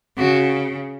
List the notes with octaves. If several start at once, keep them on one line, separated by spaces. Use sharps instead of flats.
C#3 F#4